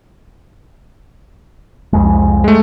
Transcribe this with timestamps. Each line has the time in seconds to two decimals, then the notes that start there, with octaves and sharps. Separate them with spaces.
1.93 C2 F2 G#3
2.44 G#3 A3